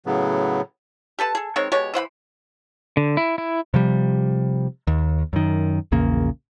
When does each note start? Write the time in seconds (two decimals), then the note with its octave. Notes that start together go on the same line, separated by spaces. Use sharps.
0.06 A2 C#3 F#3 B3
1.19 G4 A4 B4 A5
1.35 G#4 A4
1.56 D#3 G#3 C4 C#5
1.72 B2 G#3 G4 C#5
1.94 E3 C5 F#5 B5
2.97 D3
3.17 E4
3.38 E4
3.74 C3 F3 G3
4.87 D#2
5.33 F#2 D#3
5.92 A#1 E2 C#3 A#3